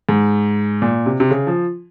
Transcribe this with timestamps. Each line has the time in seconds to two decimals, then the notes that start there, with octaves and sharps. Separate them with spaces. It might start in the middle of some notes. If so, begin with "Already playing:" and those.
0.09 G#2
0.82 A#2
1.06 C3
1.20 C3
1.31 C#3
1.47 F3